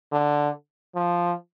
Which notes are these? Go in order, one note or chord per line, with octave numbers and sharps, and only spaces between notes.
D3
F3